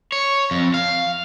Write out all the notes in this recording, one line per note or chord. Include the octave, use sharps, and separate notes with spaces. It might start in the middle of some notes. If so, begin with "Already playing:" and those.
C#5
F2
F5